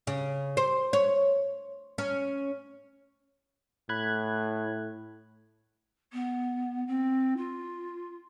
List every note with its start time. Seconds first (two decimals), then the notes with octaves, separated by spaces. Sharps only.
0.07 C#3
0.57 C5
0.93 C#5
1.98 C#4
3.89 A2 B5 F#6 G#6
6.12 B3
6.87 C4
7.37 F4